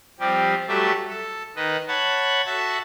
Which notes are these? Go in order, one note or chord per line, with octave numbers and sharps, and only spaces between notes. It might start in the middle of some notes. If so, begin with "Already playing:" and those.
F3 G3 C4 G4
F#3 G3 A3 G4 A4 E5
A4
D#3 B4 D#5
C#5 F#5 A5 B5
F#4 A4 E5 F#5 A5